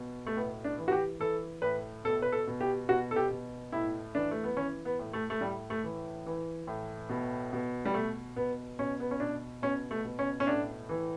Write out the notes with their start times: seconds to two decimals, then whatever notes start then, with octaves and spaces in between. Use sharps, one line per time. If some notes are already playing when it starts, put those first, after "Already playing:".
Already playing: B2
0.27 A3
0.37 A2 B3
0.64 D4
0.78 E3
0.88 F#4
0.92 G4
1.20 E3 A4
1.62 A2 B4
2.04 B2 A4
2.22 B4
2.32 A4
2.47 B2
2.61 G4
2.89 B2 F#4
3.11 A4
3.16 G4
3.30 B2
3.72 A2 E4
4.15 E3 D4
4.31 A3
4.44 B3
4.57 E3 C#4
4.85 B3
4.99 A2
5.13 A3
5.30 A3
5.41 A2 G3
5.70 A3
5.84 E3
6.26 E3
6.67 A2
7.09 B2
7.53 B2
7.85 G3
7.94 B2 A3
8.36 B2 B3
8.79 B2 C#4
9.00 B3
9.11 C#4
9.20 B2 D4
9.62 B2 C#4
9.91 A3
10.04 B2
10.19 C#4
10.40 C#4
10.47 A2 D4
10.89 E3